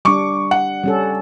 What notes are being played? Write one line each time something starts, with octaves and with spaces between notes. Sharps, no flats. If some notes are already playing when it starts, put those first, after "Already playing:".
G3 D4 C#6 D6
F#5
G3 C#4 A4